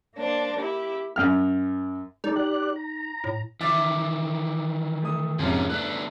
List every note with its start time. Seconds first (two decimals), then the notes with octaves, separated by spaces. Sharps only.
0.15 A#3 D4 C5
0.58 E4 G4
1.16 F#2 F6
2.24 G#3 D#4 A4 D5
2.36 G4 D5 F#6
2.76 A#5
3.24 A2
3.61 D#3 E3 E5 D6 A6
5.02 A3 D#6
5.39 F2 G#2 C3 F3 A#3 C#4
5.70 A3 B3 D4 F#6